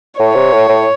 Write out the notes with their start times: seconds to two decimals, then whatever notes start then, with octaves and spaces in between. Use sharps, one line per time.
0.19 A2 C#5
0.35 C3
0.52 A2
0.69 A2